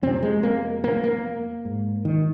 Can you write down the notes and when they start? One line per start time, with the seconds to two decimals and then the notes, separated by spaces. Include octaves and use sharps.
0.02 F2 C3 C4
0.23 G#3
0.43 A#3
0.84 A#3
1.04 A#3
1.65 G#2
2.05 D#3